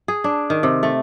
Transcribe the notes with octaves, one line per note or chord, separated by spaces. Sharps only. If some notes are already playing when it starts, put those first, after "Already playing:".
G#4
D4
D#3
C3
A3